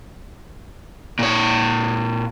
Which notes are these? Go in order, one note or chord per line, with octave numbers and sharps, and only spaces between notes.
A#2 C#5